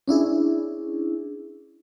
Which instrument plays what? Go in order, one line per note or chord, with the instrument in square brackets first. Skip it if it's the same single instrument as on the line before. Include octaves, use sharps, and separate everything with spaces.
[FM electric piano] C#4 D4 E4 G#4